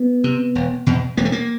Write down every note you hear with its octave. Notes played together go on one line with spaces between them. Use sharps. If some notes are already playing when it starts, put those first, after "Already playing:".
Already playing: B3
C3
E1
E2 B2
E1 A#3
A3
A#3